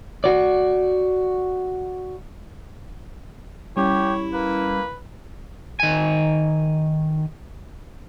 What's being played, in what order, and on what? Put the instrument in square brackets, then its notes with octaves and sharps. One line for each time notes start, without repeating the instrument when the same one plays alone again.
[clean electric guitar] F#4 D5
[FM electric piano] G3 C#4 [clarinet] E4 [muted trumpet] G4 [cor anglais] C#5
[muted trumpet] A#3 [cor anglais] B4
[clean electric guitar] D#3 G#5